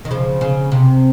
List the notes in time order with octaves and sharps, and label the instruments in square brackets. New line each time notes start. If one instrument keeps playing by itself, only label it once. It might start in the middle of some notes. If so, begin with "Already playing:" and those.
[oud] D#3
C#3 F3
C#3
C3